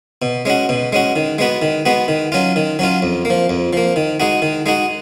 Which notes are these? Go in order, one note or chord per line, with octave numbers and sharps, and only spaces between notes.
B2
G#3 C#4 F#4
B2
G#3 C#4 F#4
D#3
G#3 B3 F#4
D#3
G#3 B3 F#4
D#3
F#3 C#4 F4
D#3
F#3 C#4 F4
F2
A#3
F3
F2
F3 A#3
D#3
G#3 D#4 F#4
D#3
G#3 D#4 F#4